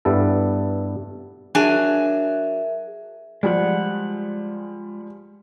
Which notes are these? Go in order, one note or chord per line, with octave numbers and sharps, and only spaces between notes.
G2 G3 B3 E4 A4
F#3 D4 G#4 A#4 E5 G#5
F3 G3 G#3 F#5